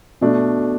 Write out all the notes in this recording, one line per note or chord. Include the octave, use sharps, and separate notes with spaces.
B2 A3 D4